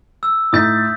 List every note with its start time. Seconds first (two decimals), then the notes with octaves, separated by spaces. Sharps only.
0.23 E6
0.53 A2 D#4 D#6 G6 A6 B6